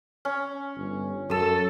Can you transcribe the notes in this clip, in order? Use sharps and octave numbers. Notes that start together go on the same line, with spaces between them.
C#4
G1
F#2 A4 D#6 E6